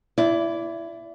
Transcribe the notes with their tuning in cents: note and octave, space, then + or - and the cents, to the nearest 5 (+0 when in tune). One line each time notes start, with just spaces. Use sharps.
E4 +20 D5 -15